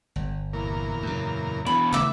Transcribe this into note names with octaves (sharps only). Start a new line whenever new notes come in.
G1
E2 A#2 A#4
F#2 C#3
B2 E3 B5
C#3 A3 B4 E5 D6